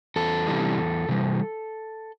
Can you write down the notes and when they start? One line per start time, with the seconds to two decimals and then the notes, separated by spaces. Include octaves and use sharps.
0.16 E2 A4
0.47 C3 E3 G3
0.78 E2
1.09 C3 E3 G3